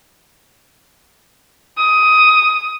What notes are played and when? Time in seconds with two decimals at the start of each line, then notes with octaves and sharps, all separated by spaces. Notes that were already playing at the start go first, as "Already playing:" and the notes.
1.77 D#6